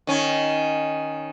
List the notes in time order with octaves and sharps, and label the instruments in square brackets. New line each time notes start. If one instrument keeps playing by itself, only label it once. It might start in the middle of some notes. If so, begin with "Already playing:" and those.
[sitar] D#3 C#4